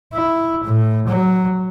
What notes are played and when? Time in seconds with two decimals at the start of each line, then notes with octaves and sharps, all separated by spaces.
0.14 E4
0.64 A2
1.08 F#3